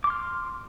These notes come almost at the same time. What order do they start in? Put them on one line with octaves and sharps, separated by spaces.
D6 C6 F6